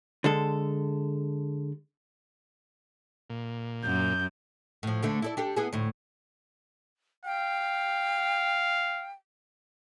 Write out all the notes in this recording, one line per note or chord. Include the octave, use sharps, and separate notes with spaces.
D3 G#3 A4
A#2
F#2 G6
A2 F3
D2 D3 A3
E4 A4 D5
D4 G4 A4
B3 E4 G#4
D2 A2
F5 G5